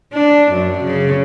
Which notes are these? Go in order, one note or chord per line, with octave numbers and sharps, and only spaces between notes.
D4
F#2
C#3